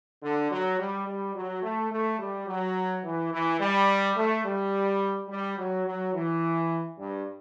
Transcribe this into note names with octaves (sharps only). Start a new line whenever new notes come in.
D3
F#3
G3
G3
F#3
A3
A3
G3
F#3
E3
E3
G3
A3
G3
G3
F#3
F#3
E3
G2